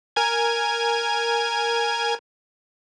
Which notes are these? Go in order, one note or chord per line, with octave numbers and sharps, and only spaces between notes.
A#4 G#5 G#6